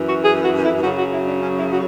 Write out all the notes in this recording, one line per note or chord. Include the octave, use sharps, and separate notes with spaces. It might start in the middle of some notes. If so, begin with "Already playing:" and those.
Already playing: F#2 E3
F#4
G#4
F#4
E4
F#2 C#3 F#3 F#4
F#4
E4
D4
C#4
E4
F#4